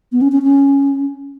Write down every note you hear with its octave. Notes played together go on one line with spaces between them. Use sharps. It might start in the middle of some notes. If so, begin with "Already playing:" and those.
B3
C#4
C#4
C#4